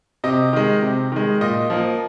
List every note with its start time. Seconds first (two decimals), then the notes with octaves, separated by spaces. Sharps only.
0.24 C3 D#5
0.53 D#3 G#3
0.82 C3
1.12 D#3 G#3
1.41 A#2 D#5
1.70 F3 A#3